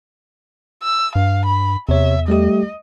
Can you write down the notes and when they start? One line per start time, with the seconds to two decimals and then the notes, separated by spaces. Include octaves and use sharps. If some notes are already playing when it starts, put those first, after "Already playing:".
0.83 E6
1.15 G2 F5
1.46 B5
1.89 E2 C3 C#5 E5
2.28 G3 A3 G4 D#5